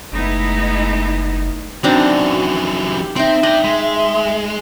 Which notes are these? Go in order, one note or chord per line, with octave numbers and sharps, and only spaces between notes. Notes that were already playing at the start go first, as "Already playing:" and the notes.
F#1 G#3 A3 B3 D#4 E4
F#2 E3 C4 D4 D#4 F#4
G4
C4 D#4 E5 G5
D4 D#5 G5
G#3